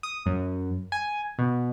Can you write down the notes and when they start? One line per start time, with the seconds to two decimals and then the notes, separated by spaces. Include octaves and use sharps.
0.03 D#6
0.26 F#2
0.92 G#5
1.39 B2